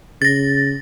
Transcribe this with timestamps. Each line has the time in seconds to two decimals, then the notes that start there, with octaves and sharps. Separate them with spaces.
0.22 C#3 A6 A#6